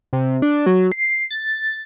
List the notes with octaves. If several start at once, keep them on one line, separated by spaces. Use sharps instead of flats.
C3
D4
F#3
C7
A6